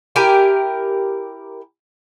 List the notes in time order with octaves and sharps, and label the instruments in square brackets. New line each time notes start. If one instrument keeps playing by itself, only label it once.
[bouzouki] E4 G4 A#4 G#5